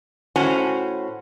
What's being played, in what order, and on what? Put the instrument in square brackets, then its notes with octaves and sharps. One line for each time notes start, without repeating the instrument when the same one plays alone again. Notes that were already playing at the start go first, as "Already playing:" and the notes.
[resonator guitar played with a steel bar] A2 C#4 F#4 C5 G#5